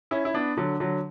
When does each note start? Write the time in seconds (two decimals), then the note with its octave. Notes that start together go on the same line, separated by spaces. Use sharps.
0.11 C#4 E4
0.25 E4
0.34 B3 D4
0.57 D3 F#3
0.80 D3 F#3